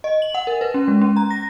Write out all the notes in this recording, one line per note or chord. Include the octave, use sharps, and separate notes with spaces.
D#5
F#7
F#5
A#4
B4
C#4
G#3
C#4
A#5
A#6